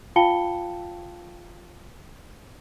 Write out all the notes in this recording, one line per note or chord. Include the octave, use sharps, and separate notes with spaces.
F4 F5 G5 A5 C#7 G7